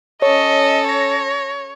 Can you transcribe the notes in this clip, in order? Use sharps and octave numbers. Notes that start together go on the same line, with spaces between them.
C#4 A4 C#5 D#5
C#5 A#6